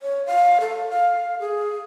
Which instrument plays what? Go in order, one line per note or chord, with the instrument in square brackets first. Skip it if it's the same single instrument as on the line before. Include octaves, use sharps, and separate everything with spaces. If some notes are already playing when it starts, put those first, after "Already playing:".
[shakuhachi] C#5
F5
A4
F5
G#4